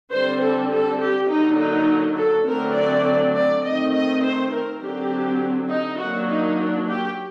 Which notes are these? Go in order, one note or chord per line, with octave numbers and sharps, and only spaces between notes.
D3 G3 C4 C5
A4
A4
G4
D3 F#3 A#3 D#4
D#4
A4
D3 F#3 A3 C4 A#4
D5
D5
D#3 A3 C4 D#5
D#5
C5
A#4
D3 F#3 C4 G4
D#4
D#3 F#3 A#3 D4 F#4
D#4
D4
G4